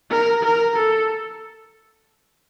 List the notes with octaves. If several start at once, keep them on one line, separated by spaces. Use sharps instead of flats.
A#4
A#4
A4